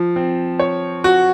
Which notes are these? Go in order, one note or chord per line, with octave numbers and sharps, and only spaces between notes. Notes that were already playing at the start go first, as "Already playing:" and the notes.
Already playing: F3
C4
C#5
F#4